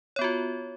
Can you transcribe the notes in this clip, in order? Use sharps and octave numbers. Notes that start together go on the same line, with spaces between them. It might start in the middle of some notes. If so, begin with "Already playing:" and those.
B3 F4 F#4 C#5